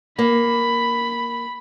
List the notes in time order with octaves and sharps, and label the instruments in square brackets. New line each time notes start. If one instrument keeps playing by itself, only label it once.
[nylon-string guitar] A#3 [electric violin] B5